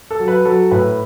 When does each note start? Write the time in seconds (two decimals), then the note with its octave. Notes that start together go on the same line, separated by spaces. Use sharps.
0.11 A4
0.20 F#3
0.28 B4
0.45 F#3 A4
0.71 A2 B4